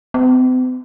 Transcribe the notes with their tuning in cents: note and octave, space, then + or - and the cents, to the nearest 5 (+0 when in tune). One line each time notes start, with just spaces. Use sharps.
C4 -45